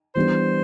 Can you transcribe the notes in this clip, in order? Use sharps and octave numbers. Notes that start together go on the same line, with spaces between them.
E3 G3 B3 D4 G4 C5